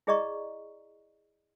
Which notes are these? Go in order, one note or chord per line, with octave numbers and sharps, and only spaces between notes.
E4 G#4 D5 D#5 A#5 C#6